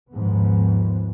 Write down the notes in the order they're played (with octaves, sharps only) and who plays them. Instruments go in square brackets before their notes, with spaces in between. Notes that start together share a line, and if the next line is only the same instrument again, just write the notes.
[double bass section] D#2 G#2 F3 B3